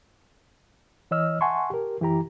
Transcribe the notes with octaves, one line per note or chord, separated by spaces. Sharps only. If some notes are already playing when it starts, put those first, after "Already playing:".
E3 C#5 D#5 E6 F6
E5 F#5 G#5 A5 C6 C#6
G4 A#4
F#2 E3 E4 G4 A#5